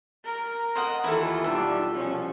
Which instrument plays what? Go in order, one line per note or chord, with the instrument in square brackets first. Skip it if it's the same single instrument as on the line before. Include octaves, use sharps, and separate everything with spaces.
[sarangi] A#4
[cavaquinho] C5 D#5 F#5
[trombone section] D#2 E3 [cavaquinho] E4 A4 [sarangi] F4
[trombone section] B1 G3 D4 [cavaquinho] E5
[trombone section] C2 B2 F3 [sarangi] C#4